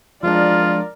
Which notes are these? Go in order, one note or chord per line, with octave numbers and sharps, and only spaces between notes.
F3 G#3 D4 F4 A#4 D5